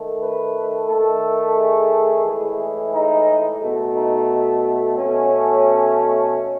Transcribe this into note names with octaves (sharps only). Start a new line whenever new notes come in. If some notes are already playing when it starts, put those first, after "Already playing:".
Already playing: D#3 A3
B4
D#3 A3 A4
G#4
A2 E3 G#3
D#4
B2 A3
D#4
B2 A3 C#4